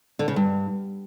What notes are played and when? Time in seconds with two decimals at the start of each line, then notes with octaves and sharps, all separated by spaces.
0.19 D3
0.28 C#3
0.36 G2